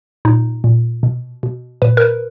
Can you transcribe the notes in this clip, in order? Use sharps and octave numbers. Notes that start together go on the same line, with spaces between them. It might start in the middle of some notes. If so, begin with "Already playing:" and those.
A#2 D#4
A#2
B2
B2
A#2 B4
A#4
B4